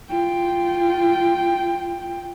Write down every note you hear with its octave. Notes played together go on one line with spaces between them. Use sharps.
F4 G5